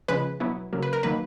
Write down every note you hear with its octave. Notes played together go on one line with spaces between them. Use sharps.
C#3 F3 G#3 B4
B2 F#3 B3 E4
C#3 F#3 A#3
B4
A#4
D#3 F#3 A#3 B4